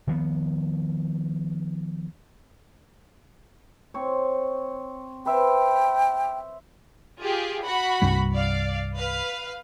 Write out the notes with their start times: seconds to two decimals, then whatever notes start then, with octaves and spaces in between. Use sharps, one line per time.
0.07 D#3 F3 B3
3.94 C4 C#5
5.26 B4 C5 E5 G5
7.20 F4 G4 G#4
7.62 F#4 F#5 B5
8.02 C2 G2 G3
8.35 D5 F5
8.96 B4 F5